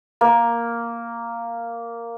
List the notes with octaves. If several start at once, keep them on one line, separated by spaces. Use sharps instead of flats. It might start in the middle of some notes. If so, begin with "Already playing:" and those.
A#3